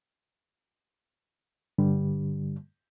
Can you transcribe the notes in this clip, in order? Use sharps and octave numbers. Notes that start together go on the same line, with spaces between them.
G2 D3 G3